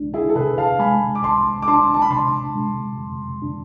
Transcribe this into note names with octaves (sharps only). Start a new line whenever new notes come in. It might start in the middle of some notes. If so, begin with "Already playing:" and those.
Already playing: C2 G#3 D4
E4 G#4
A4
C3 G#4 B4
F5 A5
G#3 G#5 B5
D6
C2 A5 C6
D6
D4 A5 C6
A5
B5
C3 A5 C6
G#3
F2
D4